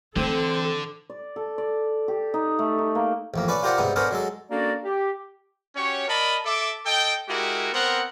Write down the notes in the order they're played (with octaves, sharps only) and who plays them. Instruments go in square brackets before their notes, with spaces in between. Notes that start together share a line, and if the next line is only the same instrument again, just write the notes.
[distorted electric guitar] D3 [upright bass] E3 [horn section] C4 [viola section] A4
[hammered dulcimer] D5
A4
D5
G4
D#4
A3
D#4
A#3
[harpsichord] A1 F2 A#3
C#4 B4 D5
F4 G4 A#4 C5 D5 F#5
G#2 C3 G3 B3 D#4
B3 C#4 D4 A4 A#4 C5
F#3 G#3 A4
[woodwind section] A#3 C#4 D4 F#4 A4 D5
G4
[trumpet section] C#4 F#4 G4 C#5
A#4 D5 D#5 A5 B5
A4 E5 D6
A4 D#5 G5
G#3 E4 F#4 G4 A#4
B3 C4 A#4 C5 F#5